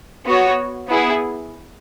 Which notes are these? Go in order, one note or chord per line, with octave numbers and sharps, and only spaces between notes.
B3 F#4 C#5
B3 E4 G#4